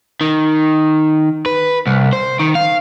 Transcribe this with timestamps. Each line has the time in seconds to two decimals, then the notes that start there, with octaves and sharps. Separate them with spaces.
0.21 D#3
1.46 B4
1.87 C2
2.13 C5
2.39 D#3
2.55 F5